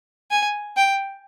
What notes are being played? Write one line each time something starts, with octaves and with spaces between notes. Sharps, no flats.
G#5
G5